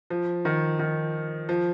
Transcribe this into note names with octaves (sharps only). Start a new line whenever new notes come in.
F3
D#3
D#3
F3